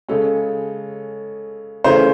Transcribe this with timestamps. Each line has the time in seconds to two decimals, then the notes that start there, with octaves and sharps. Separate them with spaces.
0.09 C#3 G#3 C#4 A4
1.84 C#3 E3 A3 C#4 C5